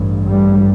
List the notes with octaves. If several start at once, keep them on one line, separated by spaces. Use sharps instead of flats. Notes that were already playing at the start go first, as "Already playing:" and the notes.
Already playing: A1 G2
G3